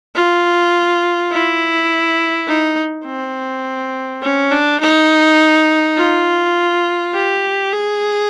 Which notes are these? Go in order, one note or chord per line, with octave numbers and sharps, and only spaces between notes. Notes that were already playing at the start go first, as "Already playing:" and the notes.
F4
E4
D#4
C4
C#4
D4
D#4
F4
G4
G#4